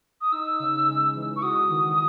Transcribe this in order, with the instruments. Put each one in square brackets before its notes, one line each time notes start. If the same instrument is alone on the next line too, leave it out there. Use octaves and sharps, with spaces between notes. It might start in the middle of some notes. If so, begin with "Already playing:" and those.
[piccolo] D#6
[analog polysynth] D#4 [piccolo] E6
[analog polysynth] C#3
G#3
E3
[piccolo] C#6
[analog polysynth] F#4 [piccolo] D#6
[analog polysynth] D#3